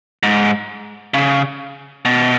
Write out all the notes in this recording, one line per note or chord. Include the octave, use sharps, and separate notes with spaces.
G#2
C#3
B2